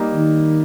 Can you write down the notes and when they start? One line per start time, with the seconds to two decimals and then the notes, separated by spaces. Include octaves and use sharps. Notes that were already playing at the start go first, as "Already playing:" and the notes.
Already playing: G3 A#3 D#4
0.14 D#3